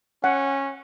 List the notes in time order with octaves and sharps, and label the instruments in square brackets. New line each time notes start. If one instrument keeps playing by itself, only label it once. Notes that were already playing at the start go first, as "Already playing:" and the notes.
[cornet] C#4 [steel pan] F#5